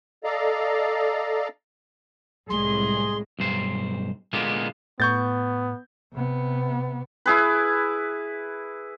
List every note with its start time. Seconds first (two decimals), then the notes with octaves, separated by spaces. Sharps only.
0.24 A4 D5 D#5 F5 A#5
2.50 C2 A2 G#3 G#4 C6
3.39 B1 G2 C5
4.33 A#2 D3 G#3 A#3 B3
5.00 A2 B3 C#6 G6 A6
6.13 C3 B3
7.26 E4 G#4 B4